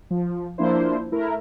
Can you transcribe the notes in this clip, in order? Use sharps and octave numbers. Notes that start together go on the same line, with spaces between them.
F3
F3 A#3 D4 E4 C5
A3 E4 A#4